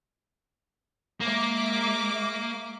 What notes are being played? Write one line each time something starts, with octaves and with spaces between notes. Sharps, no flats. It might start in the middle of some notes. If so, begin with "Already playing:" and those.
G#3 A#3 E5 D6